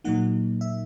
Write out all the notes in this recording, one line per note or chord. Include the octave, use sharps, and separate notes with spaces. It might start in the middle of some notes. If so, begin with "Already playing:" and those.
A#2 F#3 A#3 D#4 F#5
E5